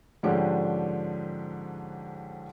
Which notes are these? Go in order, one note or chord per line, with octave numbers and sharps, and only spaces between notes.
G#2 D3 F3 C#4 D4 G4